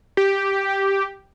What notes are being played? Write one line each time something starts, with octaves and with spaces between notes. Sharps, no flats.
G4